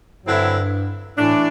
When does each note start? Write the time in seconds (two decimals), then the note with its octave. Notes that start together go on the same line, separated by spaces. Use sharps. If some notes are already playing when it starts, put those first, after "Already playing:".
0.25 G2 D3 F#3 C4 E4
1.18 A2 E3 A3 D4